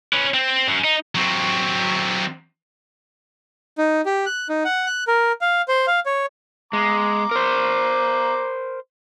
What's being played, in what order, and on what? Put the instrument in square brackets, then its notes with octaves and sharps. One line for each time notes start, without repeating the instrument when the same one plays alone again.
[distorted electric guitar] C#4 B4
C4
F#2
D#4
F#3 C4
[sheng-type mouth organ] D#4
G4
F#6
D#4
F#5
F#6
A#4
F5
C5
F5
C#5
[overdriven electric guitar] G#3 [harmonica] A#5 D6
[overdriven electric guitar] A#4 C5